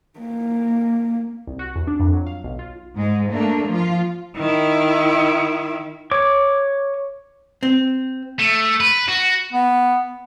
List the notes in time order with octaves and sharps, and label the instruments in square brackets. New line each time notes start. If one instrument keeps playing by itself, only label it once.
[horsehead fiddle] A#3
[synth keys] C2
F#4
E2
D4
F2
F#3
F5
B1
F4
[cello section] G#2 G#3
A3 A#3 D4
F3 F4
[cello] D#3 E4
[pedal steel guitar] C#5 D6
[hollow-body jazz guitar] C4
[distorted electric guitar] A3
B4
F#4
[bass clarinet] B3